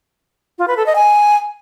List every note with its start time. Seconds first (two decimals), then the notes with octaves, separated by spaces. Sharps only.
0.58 F4
0.68 B4
0.77 A4
0.86 D#5
0.95 G#5